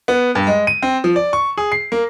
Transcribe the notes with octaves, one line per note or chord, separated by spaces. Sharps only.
B3
G2
G#3
D#7
C4
F3
D5
C#6
G#4
C7
A#3